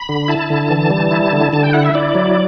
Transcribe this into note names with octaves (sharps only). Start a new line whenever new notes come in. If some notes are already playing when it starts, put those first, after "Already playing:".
Already playing: B5
D3
E4 A5
D3
E3
G3
E4
D3
D3 A5
G5
E4 F#5
E5
E4 D5
F#3